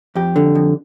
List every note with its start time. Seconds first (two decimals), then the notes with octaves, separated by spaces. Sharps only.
0.15 F2 G4
0.36 D3
0.55 F2